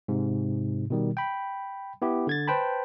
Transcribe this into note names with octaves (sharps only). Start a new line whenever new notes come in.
G#2 C3
B2 D#3 G3
G5 B5
B3 E4 G4
D3 G#6 A6
B4 C5 G5 A5 B5